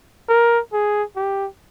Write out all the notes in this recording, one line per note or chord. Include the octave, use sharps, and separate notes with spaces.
A#4
G#4
G4